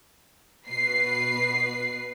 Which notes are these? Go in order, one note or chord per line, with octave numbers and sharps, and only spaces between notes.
B2 B4 C7